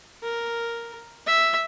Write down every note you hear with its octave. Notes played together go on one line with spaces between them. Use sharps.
A#4
E5